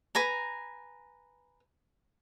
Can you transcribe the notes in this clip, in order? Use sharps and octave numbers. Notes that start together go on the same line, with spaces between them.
B4 G#5 A#5